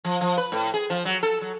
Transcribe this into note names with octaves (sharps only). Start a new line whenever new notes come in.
F3
F3
B4
A2
G#4
F3
F#3
A4
F#3